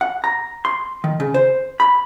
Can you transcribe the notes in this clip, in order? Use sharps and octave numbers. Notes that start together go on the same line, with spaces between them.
F#5
A#5
C6
D#3
C#3
C5
B5